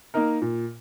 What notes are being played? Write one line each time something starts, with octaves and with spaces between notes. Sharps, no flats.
A#3 D#4 A#4
A#2